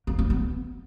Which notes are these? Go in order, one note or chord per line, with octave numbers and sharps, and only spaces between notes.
A#3
F4
B3